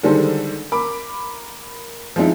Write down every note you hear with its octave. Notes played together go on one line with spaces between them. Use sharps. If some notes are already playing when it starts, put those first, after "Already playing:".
D3 D#3 G3 G#3 A4 C5
A#4 B5 D6
F3 G#3 C4 D#4 E4